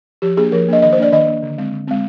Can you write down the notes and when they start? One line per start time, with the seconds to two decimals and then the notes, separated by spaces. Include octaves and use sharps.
0.22 F3 G4
0.37 A#3 D4 G#4
0.52 F3 A#4
0.68 A#3 D4 D#5
0.82 D#3 D#5
0.93 C5
0.98 A#3 D4 D5
1.12 D#3 D#5
1.27 A#3 D4
1.42 D3
1.58 G#3 C4
1.73 D3
1.87 G#3 C4